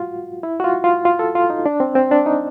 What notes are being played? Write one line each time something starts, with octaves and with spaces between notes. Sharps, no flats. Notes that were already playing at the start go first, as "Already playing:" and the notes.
Already playing: F4 F#4
E4
F#4
F4
F4
F4
A4
F4
D#4
D4
C4
C4
D4
D#4